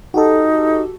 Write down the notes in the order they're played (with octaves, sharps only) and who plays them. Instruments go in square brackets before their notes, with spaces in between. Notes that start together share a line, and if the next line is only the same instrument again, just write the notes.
[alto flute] D#4 [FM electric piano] F#4 G4 A4